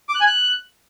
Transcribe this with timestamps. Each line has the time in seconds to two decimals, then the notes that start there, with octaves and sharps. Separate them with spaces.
0.09 D6
0.15 F#6
0.21 G#5
0.26 F#6